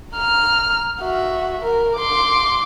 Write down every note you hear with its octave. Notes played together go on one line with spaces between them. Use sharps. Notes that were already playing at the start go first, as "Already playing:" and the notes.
A#5 F6
F#4 E5
A#4
C6 D6